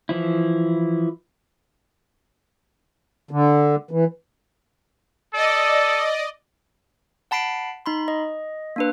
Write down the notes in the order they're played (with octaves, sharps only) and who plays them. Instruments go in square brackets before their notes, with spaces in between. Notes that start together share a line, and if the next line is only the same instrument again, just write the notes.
[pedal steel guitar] E3 F3 E4
[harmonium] D3
E3
[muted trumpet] A4 [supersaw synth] D5 D#5
[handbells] F#5 A5 B5 C7 D7
D#4 B5 C6
D#5
A#3 D4 B4